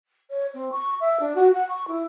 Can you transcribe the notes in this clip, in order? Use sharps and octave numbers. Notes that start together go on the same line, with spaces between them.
C#5
C4
C#6
E5
D4
F#4
F#5
C#6
E4